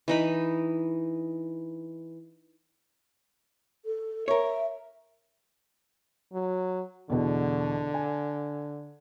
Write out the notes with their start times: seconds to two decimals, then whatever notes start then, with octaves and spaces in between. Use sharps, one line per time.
0.08 E3 D#4 B5
3.85 A4
4.28 A#4 C#5 E5
6.33 F#3
7.10 E2 B2 D3
7.94 G#5